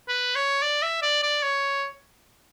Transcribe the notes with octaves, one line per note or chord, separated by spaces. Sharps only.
B4
C#5
D5
E5
D5
D5
C#5